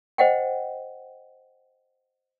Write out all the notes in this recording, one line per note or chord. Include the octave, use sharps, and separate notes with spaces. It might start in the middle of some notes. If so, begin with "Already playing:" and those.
C5 D#5 F#5 G5